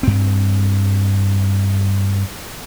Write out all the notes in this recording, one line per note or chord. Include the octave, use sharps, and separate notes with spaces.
G2 C4